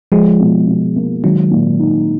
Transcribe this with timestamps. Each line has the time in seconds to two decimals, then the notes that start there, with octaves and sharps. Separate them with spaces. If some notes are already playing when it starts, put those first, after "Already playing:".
0.12 F3 G#3 F4
0.40 B2
0.68 B2
0.96 A#3
1.23 D#3 F#3 G#3
1.51 A#2
1.79 D#4